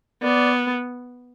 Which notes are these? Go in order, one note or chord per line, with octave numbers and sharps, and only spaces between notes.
B3 D5